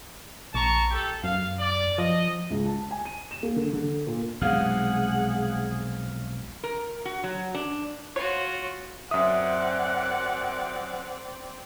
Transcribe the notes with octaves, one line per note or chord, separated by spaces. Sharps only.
A#1 A5 A#5 C#6
G4 A4
F#2 F5
D5
F3 D#5
C#2
A5
G#5
D#7
E7
A#3
D3
D3
A#2
B1 F2 C3 G#3 G#4 F5 F#5 F6
A#4
F#4
F#3
D4
F4 F#4 C#5
F#2 C4 D5 E5 F#5 D#6